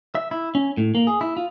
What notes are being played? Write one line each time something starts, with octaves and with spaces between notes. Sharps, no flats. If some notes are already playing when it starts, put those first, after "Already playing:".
E5
E4
C#4
A2
A#3
G#4
E4
F4